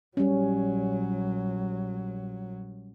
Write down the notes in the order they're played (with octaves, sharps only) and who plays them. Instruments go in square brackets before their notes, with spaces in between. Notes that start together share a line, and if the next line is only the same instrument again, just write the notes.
[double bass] A#1 F#3 [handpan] G3 C#4